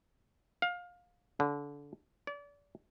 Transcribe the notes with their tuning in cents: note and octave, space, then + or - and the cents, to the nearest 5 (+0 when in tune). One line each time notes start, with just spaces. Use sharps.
F5 +25
D3 -25
D5 -35